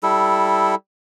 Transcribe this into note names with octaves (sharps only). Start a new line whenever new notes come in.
G3 E4 A4